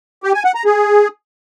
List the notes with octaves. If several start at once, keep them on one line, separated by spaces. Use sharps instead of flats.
G4
G#5
F#5
A#5
G#4